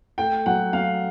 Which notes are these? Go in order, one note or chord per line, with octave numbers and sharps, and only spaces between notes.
A3 G5
F#3 F#5
F#3 F5